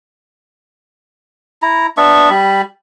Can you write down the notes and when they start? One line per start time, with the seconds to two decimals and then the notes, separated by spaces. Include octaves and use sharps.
1.62 E4 A#5
1.97 B3 D4 E5 C#6
2.30 G3 B5